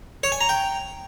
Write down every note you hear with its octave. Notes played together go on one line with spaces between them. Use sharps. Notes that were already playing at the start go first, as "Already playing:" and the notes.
C#5
G#5
A#5
G5